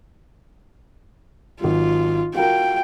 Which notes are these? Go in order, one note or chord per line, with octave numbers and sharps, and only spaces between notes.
G#1 F#3 F4
F4 F#4 A#4 G5